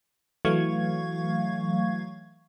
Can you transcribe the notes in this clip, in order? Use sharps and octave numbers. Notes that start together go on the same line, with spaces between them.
E3 F#3 A3 F5 C#6 G#6